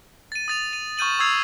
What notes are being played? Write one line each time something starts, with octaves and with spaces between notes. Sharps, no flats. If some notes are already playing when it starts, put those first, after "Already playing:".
A6 D#7
D#6 A6 F7
D#7
C#6 F6 G6 D#7 F#7
C#6 D#6 E6 G#6 C7 F7